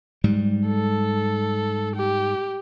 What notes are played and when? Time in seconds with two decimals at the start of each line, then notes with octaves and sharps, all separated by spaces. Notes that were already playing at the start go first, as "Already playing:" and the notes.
0.24 G#2 G3
0.68 A4
1.96 G4